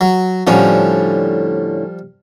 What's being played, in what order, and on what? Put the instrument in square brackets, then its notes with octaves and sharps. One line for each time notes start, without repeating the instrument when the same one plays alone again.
[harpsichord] F#3
[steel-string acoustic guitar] A2 D3 C#4 [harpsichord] F3 G3